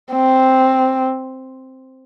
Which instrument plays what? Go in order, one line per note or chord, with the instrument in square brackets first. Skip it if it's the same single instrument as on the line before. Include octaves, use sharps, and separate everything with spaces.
[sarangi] C4